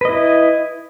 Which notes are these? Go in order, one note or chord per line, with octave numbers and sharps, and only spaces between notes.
E4 B4 D#5